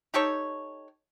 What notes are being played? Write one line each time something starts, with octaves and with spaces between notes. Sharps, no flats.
D#4 G4 A4 C#5